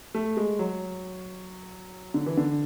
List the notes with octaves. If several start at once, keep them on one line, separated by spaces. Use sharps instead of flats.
A3
G#3
F#3
D3
E3
D3